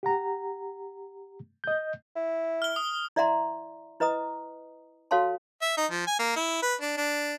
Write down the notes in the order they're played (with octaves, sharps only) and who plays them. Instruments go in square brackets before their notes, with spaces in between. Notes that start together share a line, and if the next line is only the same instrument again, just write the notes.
[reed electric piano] G4 F#5 A#5
D#5 G6
[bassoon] E4
[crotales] F6 G7
D#6
[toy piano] E4 D5 E5 F#5 A#5 C6
E4 B4 D#5 A#5 D#6
F#4 A4 C#5 F5 A5 C6
[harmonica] E5
D#4
F3
G#5
A#3
E4
B4
D4
D4